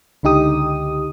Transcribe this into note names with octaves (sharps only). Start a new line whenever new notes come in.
C#2 D3 D#4 G4 D#6